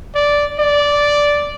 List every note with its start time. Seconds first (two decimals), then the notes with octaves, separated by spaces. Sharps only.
0.15 D5
0.59 D5